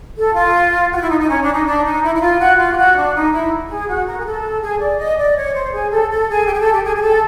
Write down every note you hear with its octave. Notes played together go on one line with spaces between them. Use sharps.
A4
F4
F#4
F4
E4
D#4
D#4
C#4
D4
D#4
D4
D#4
E4
E4
F4
F#4
F4
G4
F#4
D4
D#4
E4
G#4
F#4
A#4
G#4
A4
G#4
D5
D#5
D5
C#5
C5
G#4
A4
A4
G#4
G4
G#4
A4
G4
G#4
G#4
A4